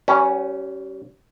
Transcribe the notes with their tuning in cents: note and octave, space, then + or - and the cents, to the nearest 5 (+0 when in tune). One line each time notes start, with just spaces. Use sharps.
G3 -35 C#4 +0 B4 +0